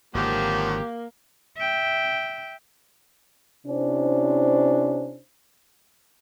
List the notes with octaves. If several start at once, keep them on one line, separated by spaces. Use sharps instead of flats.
G#1 D3 D#3 F3 F#3 A#3 F#4 G4
E5 G5
C3 C#4 D4 E4 C5